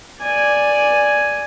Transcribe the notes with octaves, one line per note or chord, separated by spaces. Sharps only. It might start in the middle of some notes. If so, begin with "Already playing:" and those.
D5 G#5